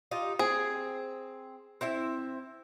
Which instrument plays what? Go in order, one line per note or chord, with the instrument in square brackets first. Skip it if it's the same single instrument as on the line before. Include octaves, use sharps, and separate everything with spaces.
[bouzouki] D#4 F4 G4
[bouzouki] C4 [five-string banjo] G#4
[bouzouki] C4 E4 E5